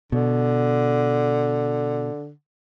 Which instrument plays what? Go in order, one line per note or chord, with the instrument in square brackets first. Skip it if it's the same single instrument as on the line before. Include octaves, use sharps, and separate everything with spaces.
[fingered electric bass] B2 [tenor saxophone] D3